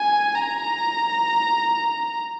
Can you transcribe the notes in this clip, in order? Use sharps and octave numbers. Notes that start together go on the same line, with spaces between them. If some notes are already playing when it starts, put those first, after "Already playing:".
Already playing: G#5
A#5